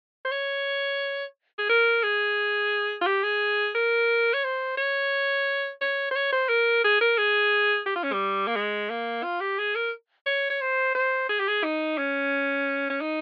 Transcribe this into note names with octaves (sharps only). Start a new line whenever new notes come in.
C5
C#5
G#4
A#4
G#4
F4
G4
G#4
A#4
C#5
C5
C#5
C#5
C5
C#5
C5
A#4
G#4
A#4
G#4
G4
F4
C#4
G3
A#3
G#3
A#3
F4
G4
G#4
A#4
C#5
C#5
C5
C5
G#4
G4
G#4
D#4
C#4
C#4
D#4